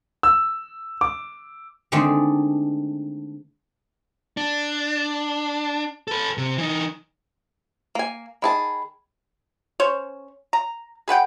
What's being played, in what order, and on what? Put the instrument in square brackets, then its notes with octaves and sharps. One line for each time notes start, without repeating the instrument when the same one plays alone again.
[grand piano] E6
D6
[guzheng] D3 D#3 G#3 A3 C4 D4
[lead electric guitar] D4
A4 B4
C3
E3 D#4
[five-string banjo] A#3 G#5
[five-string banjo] D#3 G#4 A5 [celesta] B5
[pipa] C#4 C5 C#5
A#5
G#4 B4 F#5 G5